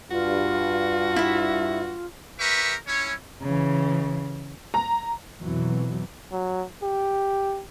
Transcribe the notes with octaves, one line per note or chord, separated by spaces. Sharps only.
G2 F4 F#4
E4 E5
G4 A#4 B4 E5 C#6
C#4 E4 C#5
C#3 E3
A#5
F2 B2 E3 F#3
F#3
G4